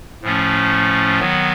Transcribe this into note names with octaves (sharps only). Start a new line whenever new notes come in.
A2 F3 A3 C#4
D#3 F#3 B3